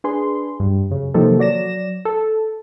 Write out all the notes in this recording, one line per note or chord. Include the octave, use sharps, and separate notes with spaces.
D4 G#4 B4 C6
G2
F#2 C#3
C3 D#3 F3 F#3 A#3 A4
F#3 D5 A#6 E7
A4